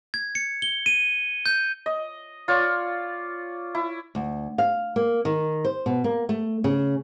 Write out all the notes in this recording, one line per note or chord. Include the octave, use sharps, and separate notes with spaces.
G#6
C#7
G7
D#7
G6
D#5
F4 C#5 D5
E4
D2
F5
A#3
D#3
C5
B2
A#3
A3
C#3